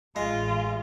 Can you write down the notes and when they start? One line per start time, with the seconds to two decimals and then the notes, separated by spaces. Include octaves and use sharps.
0.16 A1 A2 G#3 F4